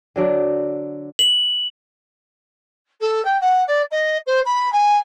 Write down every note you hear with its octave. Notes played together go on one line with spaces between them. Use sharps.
D3 F#3 D4
F#7
A4
G5
F#5
D5
D#5
C5
B5
G#5